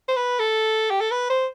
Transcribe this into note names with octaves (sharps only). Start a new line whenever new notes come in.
C5
B4
A4
G4
A4
B4
C5